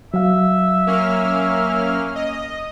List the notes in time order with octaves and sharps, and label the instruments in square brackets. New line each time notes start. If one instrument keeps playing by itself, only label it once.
[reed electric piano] F#3 F5 [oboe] E5
[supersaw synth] A#3 C#4 F6
D#5